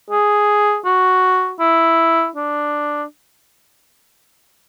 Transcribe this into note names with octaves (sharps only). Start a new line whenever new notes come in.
G#4
F#4
E4
D4